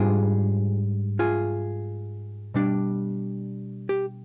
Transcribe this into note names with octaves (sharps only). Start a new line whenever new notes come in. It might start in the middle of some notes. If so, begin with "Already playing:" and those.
Already playing: G#2 G3 D4 F4 G#4
F4 G#4
B2 G3 D4
G4